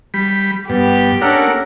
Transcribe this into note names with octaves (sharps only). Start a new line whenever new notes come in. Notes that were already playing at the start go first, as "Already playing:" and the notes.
G3 B5
G2 B3 G4
A#3 C#4 D4 A4 A#4 F#5